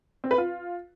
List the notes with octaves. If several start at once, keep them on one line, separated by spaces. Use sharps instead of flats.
C4
B4
F4